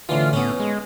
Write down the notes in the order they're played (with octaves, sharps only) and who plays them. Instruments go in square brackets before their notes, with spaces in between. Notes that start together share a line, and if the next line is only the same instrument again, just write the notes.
[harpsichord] A2 D3 E3 [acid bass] F4
[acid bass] A2 [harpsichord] B3 C#4
[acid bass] G#3